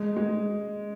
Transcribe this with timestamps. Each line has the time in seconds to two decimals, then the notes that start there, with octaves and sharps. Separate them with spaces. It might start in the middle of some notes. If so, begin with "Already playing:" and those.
Already playing: G#3
0.16 G#3